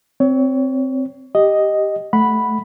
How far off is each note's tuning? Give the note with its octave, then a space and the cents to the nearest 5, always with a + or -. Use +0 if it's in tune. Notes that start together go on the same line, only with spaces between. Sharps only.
C4 +0 C#5 +25
G4 +0 D#5 +0
A3 -10 F#5 +0 B5 +0